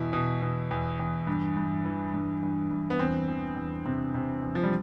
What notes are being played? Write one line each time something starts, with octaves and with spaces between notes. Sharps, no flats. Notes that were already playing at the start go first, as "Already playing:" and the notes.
Already playing: E2 B2 E4
B2
B2
E2
E2
G2
G2
E3
G2
G2
G2
B3
E2 C4
E3
E2
C3 C4
C3
E2
F3
G3